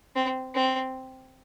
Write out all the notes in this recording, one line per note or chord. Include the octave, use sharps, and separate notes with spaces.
C4
C4